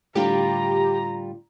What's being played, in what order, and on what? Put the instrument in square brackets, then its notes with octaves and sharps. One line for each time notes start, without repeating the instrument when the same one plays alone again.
[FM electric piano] A2 D3 [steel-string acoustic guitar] G3 F4 [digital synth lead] G4 [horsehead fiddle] A#5